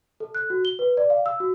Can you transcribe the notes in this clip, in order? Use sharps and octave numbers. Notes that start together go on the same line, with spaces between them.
A4
F#6
F#4
G7
B4
D5
F5
E6
F#4